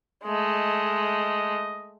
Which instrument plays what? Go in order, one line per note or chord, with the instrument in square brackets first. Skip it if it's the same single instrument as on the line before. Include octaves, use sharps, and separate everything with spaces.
[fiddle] G#3 A3 [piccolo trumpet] D#5